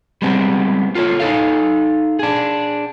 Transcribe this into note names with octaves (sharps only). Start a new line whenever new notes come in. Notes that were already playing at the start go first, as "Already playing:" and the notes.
G3 G#3 B3 C4
F4 A4 B4 C#5
D#4 A4 F5
D4 G#4